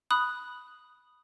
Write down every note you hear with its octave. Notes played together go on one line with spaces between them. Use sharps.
B5 D#6 F#6